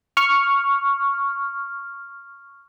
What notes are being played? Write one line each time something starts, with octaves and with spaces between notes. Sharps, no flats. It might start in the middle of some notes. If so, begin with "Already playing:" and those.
C#6 F6